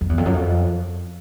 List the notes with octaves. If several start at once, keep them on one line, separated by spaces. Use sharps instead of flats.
F2
E2
F2
F#2
F2